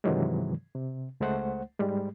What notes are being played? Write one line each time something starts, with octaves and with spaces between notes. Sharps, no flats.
G2 C3 D#3 E3 F#3 G#3
C3
C#2 G#3 A3 C5 F#5
G#2 G3 G#3